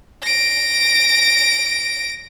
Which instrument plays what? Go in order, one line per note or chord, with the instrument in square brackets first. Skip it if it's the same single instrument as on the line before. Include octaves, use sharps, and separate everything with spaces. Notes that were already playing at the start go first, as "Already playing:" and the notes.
[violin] A#6 D7